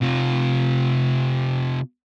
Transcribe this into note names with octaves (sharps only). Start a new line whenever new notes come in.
C3 F4